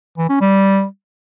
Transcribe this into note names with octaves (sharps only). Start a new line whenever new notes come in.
E3
C#4
G3